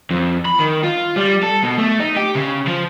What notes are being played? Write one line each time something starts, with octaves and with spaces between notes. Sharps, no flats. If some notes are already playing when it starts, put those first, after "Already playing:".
F2
B5
D#3
F4
G3
A4
B2
A3
D#4
G4
C#3
F3